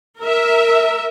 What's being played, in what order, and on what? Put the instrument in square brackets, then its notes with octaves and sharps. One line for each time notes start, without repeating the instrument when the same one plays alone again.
[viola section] A#4 E5